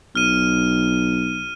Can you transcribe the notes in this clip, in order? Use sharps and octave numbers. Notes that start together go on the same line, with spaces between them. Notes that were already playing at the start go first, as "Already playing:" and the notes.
B1 F6 D#7